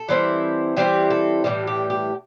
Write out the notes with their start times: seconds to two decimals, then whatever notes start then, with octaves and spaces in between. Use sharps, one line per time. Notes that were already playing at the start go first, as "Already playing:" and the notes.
Already playing: A4
0.09 E3 G3 C4 E4
0.77 E3 G3 C4 E4 G4
1.10 A4
1.44 A2 E3 G3 G4
1.67 G4
1.90 G4